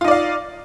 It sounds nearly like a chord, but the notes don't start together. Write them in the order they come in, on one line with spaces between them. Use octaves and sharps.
F4 D#4 D5 F5